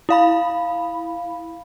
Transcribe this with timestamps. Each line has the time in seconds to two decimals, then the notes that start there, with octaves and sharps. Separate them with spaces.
0.09 E4 F5 B5